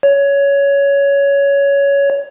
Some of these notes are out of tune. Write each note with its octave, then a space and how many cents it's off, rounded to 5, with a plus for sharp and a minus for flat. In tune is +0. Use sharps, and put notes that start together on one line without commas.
C#5 +15